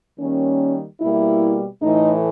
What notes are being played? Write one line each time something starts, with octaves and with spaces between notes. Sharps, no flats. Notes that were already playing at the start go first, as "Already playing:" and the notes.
D#3 G3 A#3 C#4
B2 G3 A#3 E4
A2 E3 A3 D#4